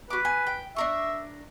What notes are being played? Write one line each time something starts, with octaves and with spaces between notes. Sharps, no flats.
F#4 B4 D6
G#5
G5
D4 A#4 E5 C#6